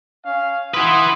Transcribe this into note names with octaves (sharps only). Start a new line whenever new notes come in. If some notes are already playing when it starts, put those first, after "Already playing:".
C#4 F5
E4 B4 F#5 C6 D#6